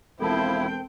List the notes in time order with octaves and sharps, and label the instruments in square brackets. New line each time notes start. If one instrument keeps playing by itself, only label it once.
[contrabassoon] E1 [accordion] F3 E4 [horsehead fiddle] C4 G5 [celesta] A4 A#4 A5